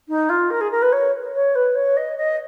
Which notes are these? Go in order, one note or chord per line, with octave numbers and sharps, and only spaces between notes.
D#4
F4
A#4
G#4
A#4
B4
C#5
C#5
B4
C#5
D#5
D#5